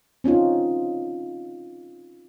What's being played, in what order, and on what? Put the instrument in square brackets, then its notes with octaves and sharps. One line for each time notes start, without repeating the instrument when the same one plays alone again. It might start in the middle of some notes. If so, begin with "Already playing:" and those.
[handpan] C4 C#4 D#4 F4